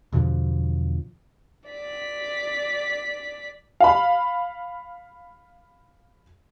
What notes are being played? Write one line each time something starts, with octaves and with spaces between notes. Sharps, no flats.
E2 B2 D3 F3
D5 B6
F5 B5